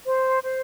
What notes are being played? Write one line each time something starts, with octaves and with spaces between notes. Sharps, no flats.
C5
C5